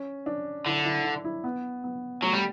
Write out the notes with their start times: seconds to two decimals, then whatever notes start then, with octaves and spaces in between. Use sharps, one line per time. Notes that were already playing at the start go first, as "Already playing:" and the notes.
Already playing: C#4
0.26 D4
0.66 D3 E4
0.85 E4
1.04 D4
1.25 E4
1.44 B3
1.84 B3
2.22 F#3 A3
2.33 G3